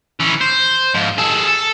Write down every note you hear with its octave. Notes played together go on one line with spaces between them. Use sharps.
E3 C#4
C5
G#2 F3
G#4 A4
A4